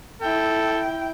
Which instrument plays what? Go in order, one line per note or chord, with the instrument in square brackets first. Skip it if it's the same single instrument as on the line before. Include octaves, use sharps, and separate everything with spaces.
[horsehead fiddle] E4 G5 [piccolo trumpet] A4